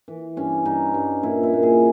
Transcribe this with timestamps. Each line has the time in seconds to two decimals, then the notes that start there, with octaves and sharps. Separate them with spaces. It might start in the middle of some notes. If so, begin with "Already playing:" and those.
0.08 E3
0.37 G2 C#4
0.65 G2 D#4
0.94 G2
1.23 A#2 E4
1.43 E4
1.53 A#2
1.63 G#4